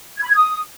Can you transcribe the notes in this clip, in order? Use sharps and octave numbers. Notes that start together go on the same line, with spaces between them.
G#6
B5
G#6
D#6